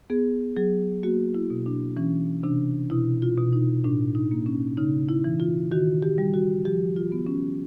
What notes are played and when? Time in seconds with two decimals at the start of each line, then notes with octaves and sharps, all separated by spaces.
0.10 B3 G#4
0.57 F#3 G#4
1.03 A#3 F#4
1.35 E4
1.50 B2
1.66 D4
1.97 E3 C#4
2.43 C3 D4
2.90 B2 E4
3.22 F4
3.37 B2
3.53 D#4
3.84 A2 D4
4.15 D#4
4.31 A#3
4.46 C#4
4.77 C#3 D#4
5.09 E4
5.24 E3
5.40 F4
5.72 D#3 F#4
6.02 G4
6.18 G3
6.34 F#4
6.65 F3 G4
6.96 F4
7.12 B3
7.27 C#4